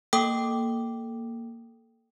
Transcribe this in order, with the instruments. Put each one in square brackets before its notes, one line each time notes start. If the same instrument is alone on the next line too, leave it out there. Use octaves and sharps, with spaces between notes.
[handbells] A#3 A4 G5 D6 D#6